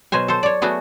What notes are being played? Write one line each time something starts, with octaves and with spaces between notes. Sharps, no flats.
B2 F#3 C5 G#5
A4 C5
C#5 D5
F#3 A3 B3 F#4 G#4